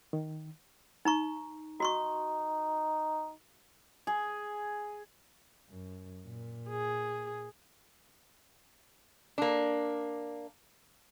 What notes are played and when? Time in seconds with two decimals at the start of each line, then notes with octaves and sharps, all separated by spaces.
0.13 D#3
1.05 D#4 A#5 C#6
1.80 D#4 F#4 C6 C#6
4.07 G#4
5.69 F#2
6.25 A#2
6.69 G#4
9.38 A#3 D4